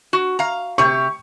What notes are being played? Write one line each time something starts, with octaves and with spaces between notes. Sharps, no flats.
F#4
F5 A#5
C3 G4 C#6